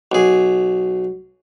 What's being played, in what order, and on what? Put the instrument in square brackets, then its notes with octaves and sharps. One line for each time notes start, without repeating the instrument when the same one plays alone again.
[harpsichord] B1 G#4